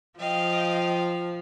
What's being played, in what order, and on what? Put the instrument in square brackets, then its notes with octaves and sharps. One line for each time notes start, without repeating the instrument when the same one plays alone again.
[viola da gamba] F3 [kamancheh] D#5 G5 [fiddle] F5